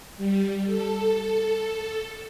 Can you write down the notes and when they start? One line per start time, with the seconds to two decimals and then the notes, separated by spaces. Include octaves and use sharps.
0.17 G3
0.65 A4